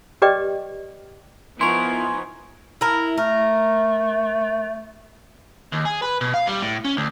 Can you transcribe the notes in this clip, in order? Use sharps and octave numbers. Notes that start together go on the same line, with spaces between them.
G4 B4 D5 D#5 G5 D6
F3 B3 D#4 E4 A#4 G#5 C6 C#6
E4 A#4
A3 A#4
D#2
G#4
B4
B2
F5
G3
A2
C#4
D2